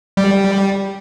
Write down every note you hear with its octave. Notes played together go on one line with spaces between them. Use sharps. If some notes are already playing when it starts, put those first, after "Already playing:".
G3